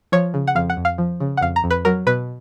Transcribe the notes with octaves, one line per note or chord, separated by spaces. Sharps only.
F3 C#5
C#3
F#5
F2 F5
F#5
F2
F5
F3
C#3
F#5
F2 F5
A#5
F2
B4
F#3 A#4
B2 B4